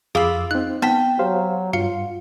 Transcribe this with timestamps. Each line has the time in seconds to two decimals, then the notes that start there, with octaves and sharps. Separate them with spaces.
0.15 F2 F4 G#4 F5 B5 D6 E6
0.51 C4 D#4 F#6
0.82 B3 G5 A5 B6
1.19 F#3 G4 C5 F5
1.73 G2 F4 F5 C#7